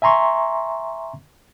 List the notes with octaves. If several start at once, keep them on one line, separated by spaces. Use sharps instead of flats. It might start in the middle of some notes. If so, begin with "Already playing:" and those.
E5 G#5 A#5 C6 C#6